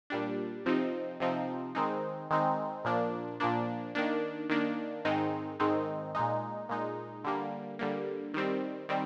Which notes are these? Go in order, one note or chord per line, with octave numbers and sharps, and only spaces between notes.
A#2 G3 D4
C3 F3 C4 D#4
C3 F3 C4 D#4
D#3 G#3 C4 D#4
D#3 G#3 C4 D#4
A#2 F3 A#3 D4
A#2 F3 A#3 D4
D#3 A#3 D4
D#3 A#3 D4
G#2 D#3 G#3 C4 D#4
G#2 D#3 G#3 C4 D#4
A#2 G#3 D#4
A#2 G#3 D#4
D3 G3 A#3
D3 G3 A#3
D#3 G3 C4
D#3 G3 C4